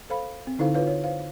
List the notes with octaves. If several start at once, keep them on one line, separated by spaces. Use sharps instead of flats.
A4 C5 F5 B5
C4
D3 D#4 E4 A4 C5 F5
F4 B4 C#5 F5
C#5
C5 F5